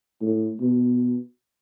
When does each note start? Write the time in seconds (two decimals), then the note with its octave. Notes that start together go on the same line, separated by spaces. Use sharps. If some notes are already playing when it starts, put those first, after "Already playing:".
0.22 A2
0.61 B2